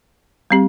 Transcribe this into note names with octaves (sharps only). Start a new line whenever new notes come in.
G3 C4 G4